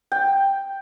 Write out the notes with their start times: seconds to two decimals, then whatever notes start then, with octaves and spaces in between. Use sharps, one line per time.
0.12 G5